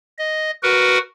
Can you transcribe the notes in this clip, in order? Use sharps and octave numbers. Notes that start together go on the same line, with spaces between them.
D#5
F#4 A#4 B4 F#5